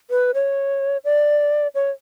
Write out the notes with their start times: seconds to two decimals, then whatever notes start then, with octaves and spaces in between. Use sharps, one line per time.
0.10 B4
0.34 C#5
1.05 D5
1.75 C#5